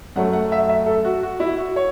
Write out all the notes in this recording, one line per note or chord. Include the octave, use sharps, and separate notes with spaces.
F#2 F#3 A3 F#5
F#5
E5
E5
A4
F#4
F#4
E4
F#4
C#5